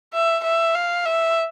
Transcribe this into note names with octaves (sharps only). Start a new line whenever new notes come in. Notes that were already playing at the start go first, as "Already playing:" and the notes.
E5
E5
F5
E5